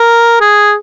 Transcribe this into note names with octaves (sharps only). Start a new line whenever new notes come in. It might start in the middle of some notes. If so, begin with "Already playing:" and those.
Already playing: A#4
G#4